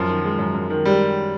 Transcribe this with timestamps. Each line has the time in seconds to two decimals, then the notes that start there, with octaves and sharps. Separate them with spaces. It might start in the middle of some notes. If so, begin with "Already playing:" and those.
Already playing: F#2 F3
0.09 D#3
0.24 G#3
0.39 F#2
0.54 F#2
0.70 D#3
0.85 G3 G#3